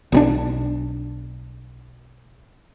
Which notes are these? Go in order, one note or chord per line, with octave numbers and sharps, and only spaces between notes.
B1 G3 D4